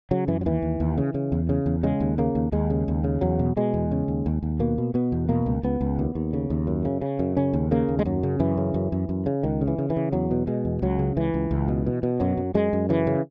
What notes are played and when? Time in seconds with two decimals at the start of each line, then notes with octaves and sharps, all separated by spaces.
0.11 C#3 F#3
0.28 F#2 E3
0.41 F#3
0.46 D#2 E3
0.62 D#2
0.80 D#2
0.98 C#3
1.14 C#3
1.32 E2
1.49 C#3
1.66 E2
1.83 C#3 G#3
2.00 D#2
2.18 C#3 A#3
2.35 D#2
2.52 D#2 G#3
2.70 C#3
2.88 D#2
3.04 C#3
3.21 E2 F#3
3.39 B2
3.57 B2 G#3
3.74 E2
3.91 C#3
4.08 D#2
4.26 D#2
4.43 D#2
4.60 B2 A#3
4.78 B2
4.94 B2 B3
5.12 E2
5.29 B2 A#3
5.46 C#2
5.63 C#2 B3
5.81 C#2
5.99 D#2
6.15 D#2
6.33 C#3
6.50 D#2
6.67 F#2
6.85 C#3
7.01 C#3
7.19 F#2
7.37 C#3 C#4
7.53 D#2
7.71 C#3 A#3
7.88 D#2
7.99 G#3
8.05 F#2 F#3
8.23 C#3
8.40 F#2 E3
8.57 C#3
8.74 F#2
8.92 F#2
9.09 F#2
9.26 C#3
9.43 C#2 D#3
9.61 C#3
9.67 E3
9.78 C#3
9.90 E3
9.96 C#3
10.13 E2 F#3
10.31 B2
10.47 B2 G#3
10.65 E2
10.82 C#2 F#3
10.99 C#3
11.17 C#2 E3
11.34 C#2
11.51 C#2
11.68 B2
11.86 B2
12.03 B2
12.20 F#2 F#3
12.37 F#2
12.54 F#2 G#3
12.73 F#2
12.89 C#3 E3
13.07 C#3